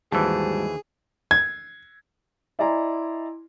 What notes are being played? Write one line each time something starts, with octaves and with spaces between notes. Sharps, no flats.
D#2 G#2 E3 G3 F#4 G#4 C5 A5
G#6
E4 D5 D#5 G#5 A#5 C6